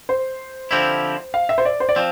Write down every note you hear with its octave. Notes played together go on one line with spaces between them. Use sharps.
C5
D3 F3 C4 E4 G4
F5
E5
C5
D5
C5
D5
F3 C4